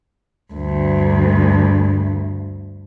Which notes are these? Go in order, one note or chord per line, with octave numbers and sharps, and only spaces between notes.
D2 G2